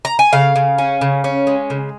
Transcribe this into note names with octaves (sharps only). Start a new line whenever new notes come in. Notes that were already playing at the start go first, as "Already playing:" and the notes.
A#5
G#5
C#3 F5
C#3
C#4
C#3
C#4
G#3
C#3